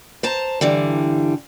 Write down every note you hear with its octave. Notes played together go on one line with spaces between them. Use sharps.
C5 A5 A#5
G2 D3 E3 G3